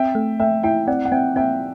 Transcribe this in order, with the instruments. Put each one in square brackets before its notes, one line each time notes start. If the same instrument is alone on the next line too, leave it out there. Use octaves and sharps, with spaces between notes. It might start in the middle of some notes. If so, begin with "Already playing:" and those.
Already playing: [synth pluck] C4 [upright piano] E5 G5
[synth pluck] A3
[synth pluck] A3 [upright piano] E5 G5
[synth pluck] E4 [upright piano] E5 G5
[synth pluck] C4 [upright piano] D5 F#5
[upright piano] F#5
[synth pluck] C4 [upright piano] E5 G5
[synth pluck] C4 [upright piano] E5 G5